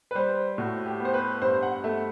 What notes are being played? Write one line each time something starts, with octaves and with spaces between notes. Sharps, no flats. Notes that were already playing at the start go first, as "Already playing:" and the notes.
B4
G3 C5
A2 F#4
G4
B3
C5
B4
G2 C5
F#5
A3 E5